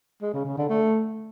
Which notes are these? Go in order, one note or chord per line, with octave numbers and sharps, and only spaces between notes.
G#3
C#3
C#3
D3
A3